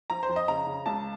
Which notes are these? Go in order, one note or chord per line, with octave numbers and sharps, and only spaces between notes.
F3 A#5
C5
F2
D#5
C#3 A#5
C#3
C#2 A5